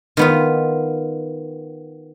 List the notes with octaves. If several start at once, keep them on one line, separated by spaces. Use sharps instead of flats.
D#3 B3 F4